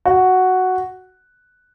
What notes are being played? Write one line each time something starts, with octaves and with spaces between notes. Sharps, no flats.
F#4